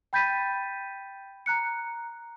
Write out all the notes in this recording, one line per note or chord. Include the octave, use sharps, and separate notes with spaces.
G5 B5 G6 A6 B6 D#7
A#5 F#6 C#7